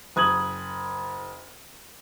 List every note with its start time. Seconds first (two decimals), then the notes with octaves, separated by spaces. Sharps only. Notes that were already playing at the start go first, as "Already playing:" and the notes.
0.16 F#1 D#6 G#6 F#7